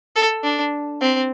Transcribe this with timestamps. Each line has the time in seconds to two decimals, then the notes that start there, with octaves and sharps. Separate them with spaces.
0.16 A4
0.44 D4
1.01 C4